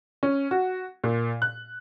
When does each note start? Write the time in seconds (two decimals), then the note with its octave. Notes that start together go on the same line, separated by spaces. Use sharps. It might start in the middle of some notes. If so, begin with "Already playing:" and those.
0.23 C#4
0.51 F#4
1.04 A#2
1.42 F#6